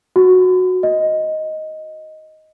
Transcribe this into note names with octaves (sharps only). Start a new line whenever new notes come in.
F#4
D#5